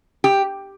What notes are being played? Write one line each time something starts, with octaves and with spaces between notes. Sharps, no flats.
G4